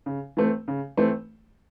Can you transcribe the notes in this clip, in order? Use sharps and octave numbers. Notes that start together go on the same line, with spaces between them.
C#3
E3 A3 C4
C#3
E3 A3 C4